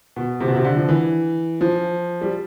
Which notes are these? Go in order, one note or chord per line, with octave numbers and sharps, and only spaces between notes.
B2
C3
B2
C3
D3
F3
E3
F3
G3